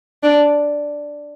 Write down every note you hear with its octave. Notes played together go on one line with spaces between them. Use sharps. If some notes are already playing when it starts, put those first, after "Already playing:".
D4